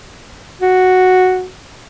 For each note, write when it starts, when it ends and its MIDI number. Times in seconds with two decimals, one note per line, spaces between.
0.61 1.47 66